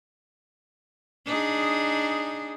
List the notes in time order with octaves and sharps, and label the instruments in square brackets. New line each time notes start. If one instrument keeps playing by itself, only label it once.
[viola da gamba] D4 D#4 G#4